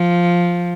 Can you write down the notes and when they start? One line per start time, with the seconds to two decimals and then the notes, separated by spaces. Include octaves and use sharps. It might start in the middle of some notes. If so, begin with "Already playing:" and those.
Already playing: F3